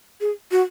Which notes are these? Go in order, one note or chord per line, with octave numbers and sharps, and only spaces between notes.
G#4
F#4